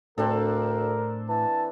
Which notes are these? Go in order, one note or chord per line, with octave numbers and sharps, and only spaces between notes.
D2 A2 C4 D4 A4 A#4
E3 A5